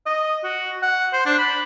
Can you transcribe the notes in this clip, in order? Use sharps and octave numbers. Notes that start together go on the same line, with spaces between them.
D#5
F#4
F#5
C5
D4
B5